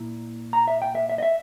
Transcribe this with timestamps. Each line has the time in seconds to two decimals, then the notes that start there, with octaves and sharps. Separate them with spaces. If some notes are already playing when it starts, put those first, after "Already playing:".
Already playing: A#2 A#3 E4
0.53 A#5
0.68 E5
0.82 G5
0.95 E5
1.10 E5
1.18 D#5
1.23 E5